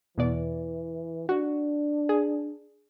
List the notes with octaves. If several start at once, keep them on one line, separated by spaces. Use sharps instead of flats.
E2 B2 E3 D5
D4 F#4
G#4